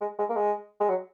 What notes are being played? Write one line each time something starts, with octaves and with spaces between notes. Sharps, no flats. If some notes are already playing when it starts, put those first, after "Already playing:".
G#3
G#3
A#3
G#3
G#3
F#3